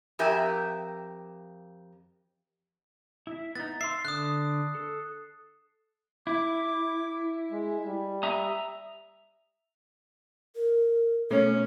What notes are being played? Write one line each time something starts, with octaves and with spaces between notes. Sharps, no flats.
F2 G4 A#4 E5 G#5
E4 E5
B3 D#4 A6
E5 F5 C6 C7
D3 D#6 F#6
A4
E4 D6
G#3
G3
E5 A#5 D#6
A#4
B2 A3 C#4 C#5